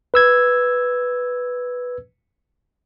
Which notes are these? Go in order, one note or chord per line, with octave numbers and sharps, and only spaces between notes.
B4 E6 G#6